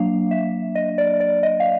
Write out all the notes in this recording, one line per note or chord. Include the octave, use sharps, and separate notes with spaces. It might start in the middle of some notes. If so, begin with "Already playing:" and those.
Already playing: F#3 A#3 D4 F5
E5
D#5
D5
D5
D#5
F5